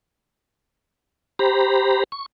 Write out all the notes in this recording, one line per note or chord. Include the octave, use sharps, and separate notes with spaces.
G4 C5 A#5 B5
C#6